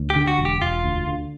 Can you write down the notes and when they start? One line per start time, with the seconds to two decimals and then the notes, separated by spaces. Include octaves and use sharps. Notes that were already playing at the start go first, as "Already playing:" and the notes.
Already playing: D2
0.10 G4
0.16 D3
0.27 F#4
0.39 E1
0.45 G4
0.62 E1 F4
0.84 D2
1.07 D3